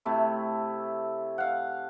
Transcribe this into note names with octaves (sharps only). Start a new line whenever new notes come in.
C3 A3 E4
F5 F#5